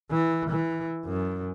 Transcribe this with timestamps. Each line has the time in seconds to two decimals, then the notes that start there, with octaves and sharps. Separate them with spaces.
0.11 E3
0.50 E3
1.05 F#2